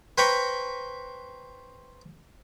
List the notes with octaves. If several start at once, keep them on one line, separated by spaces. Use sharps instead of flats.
B4 C5 G5 A#5 B5 C#6